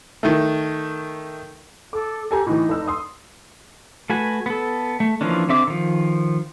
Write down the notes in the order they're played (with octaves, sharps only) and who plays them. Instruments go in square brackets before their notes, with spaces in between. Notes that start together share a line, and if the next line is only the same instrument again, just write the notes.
[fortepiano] D#3 A3
[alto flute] A4 [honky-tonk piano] D6
[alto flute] G4 [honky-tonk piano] A4 G#5 A#5
[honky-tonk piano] A2 E3 [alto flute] D#4
[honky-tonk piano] F1 E6
C6 D#6
[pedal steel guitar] A3 F#4 B4 G#5
B3 A4
A3
E3 F3 A#3 C#4 D4
D3 C4 E5 D6
D#3 F3